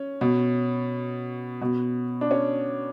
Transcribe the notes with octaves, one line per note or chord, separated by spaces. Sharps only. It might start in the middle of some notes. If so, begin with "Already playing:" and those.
Already playing: C#4
B2
B2
D4
C#4